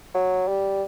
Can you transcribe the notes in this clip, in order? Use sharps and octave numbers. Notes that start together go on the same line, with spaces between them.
F#3
G3